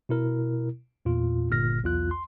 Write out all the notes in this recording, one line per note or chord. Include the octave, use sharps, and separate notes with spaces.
B2 E4 A#4
E2 A#2 F4
G1 A#2 F6 A#6
B1 E2 F4 F#6
C6